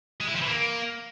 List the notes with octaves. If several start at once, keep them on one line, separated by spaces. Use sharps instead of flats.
G#3
E4
F3
E3
A#3